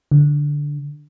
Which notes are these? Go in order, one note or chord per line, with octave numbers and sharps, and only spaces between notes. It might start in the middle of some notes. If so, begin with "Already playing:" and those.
D3